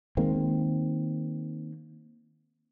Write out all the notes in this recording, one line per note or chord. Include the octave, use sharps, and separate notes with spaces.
D#3 G#3 A#3 C4